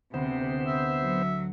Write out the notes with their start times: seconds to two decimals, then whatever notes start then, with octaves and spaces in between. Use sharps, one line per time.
0.14 D2 C3 B3 C5
0.67 E5
1.02 F#3